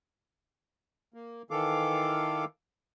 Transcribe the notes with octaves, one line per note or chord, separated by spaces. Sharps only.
A#3
D#3 E3 A4 F5 D6